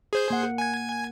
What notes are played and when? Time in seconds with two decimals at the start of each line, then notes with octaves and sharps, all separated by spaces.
0.13 G#4 C5 G6
0.30 A#3 F#5
0.58 G#5 G#6